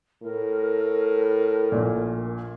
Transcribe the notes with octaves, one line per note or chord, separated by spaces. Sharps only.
A2 A#4
A#1 A#2